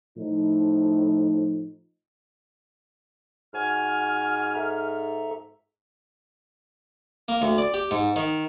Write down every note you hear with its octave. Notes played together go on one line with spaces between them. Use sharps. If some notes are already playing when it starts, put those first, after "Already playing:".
A2 F3 D#4
G#2 F#4 G#5 F6
A4 E5 A#5
A#3
D2
D5
G4
G#2
D#3